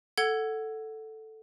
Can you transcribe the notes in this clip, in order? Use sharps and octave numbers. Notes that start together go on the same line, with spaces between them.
A4 F#5 G#6 G7